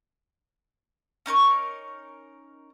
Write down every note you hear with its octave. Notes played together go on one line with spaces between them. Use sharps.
C#4 D#4 A#4 C#6